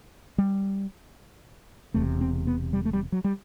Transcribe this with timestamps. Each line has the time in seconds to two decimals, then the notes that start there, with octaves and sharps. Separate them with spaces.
0.38 G3
1.94 E1 E2 C3 A3
2.21 C4
2.47 B3
2.73 G3
2.85 A3
2.93 G3
3.12 F#3
3.24 G3